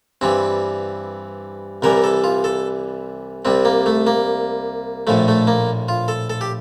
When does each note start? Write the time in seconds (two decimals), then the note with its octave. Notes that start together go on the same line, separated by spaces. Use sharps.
0.21 G2 E3 G3 C4
1.82 C2 C3 E3 G3 A#4
2.04 A4
2.24 F4
2.44 A4
3.45 C2 C3 G3 C4
3.65 A#3
3.86 A3
4.07 A#3
5.07 A#1 A2 F3 A3
5.28 A3
5.47 A#3
5.89 F4
6.08 A4
6.30 A4
6.41 G4